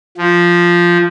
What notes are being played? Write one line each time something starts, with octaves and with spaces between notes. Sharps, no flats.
F3